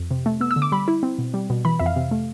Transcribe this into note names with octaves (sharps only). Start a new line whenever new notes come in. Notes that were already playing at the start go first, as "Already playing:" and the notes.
Already playing: F2
C3
A3
B3 E6
E6
D3
D6
G3 B5
E4
C4
B2
G3
B2
E3 B5
F2 E5
F5
C3
A3